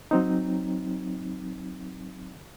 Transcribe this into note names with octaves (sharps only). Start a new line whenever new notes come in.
F#3 C4 D#4